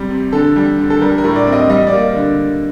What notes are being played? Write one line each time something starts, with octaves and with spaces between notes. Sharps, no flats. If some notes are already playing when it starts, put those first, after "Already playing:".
Already playing: C3 G3
C3
D3 A4
G3
D3
A4
G3 A#4
A#4
A2
D5
C4
D#5
G3 D#5
D5
A#3
D3